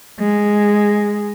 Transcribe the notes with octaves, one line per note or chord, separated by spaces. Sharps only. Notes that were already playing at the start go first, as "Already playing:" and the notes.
G#3